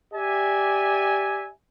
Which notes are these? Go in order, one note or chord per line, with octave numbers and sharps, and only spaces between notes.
G4 D5 E5 G#5